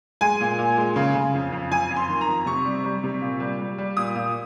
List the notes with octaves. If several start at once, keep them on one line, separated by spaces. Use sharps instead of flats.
G#3 G#5
A#2
A#2
G#3
C#3
C#3
F2
F2
F2 G#5
F2
C6
D#3
A#5
F2
C3 C#6
G3
G3
C3
A#2
G3
G3
G3
A#2 D#6
A#2